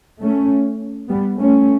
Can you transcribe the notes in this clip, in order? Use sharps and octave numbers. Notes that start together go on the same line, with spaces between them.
A3 C#4
G3 B3
A3 C#4